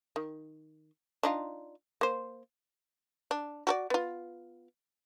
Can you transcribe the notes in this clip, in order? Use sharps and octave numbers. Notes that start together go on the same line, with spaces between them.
D#3
D4 D#4 F4
A#3 C5
D4
F#4 A4 D5
B3 F4